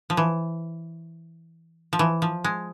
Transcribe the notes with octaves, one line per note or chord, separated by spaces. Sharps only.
F3
E3
F3
E3
F3
G#3